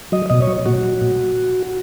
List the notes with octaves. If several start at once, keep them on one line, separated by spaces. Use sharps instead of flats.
F#3 D#5
B2 D#5
C#5
F#3
A#2 F#4
F#3
A#2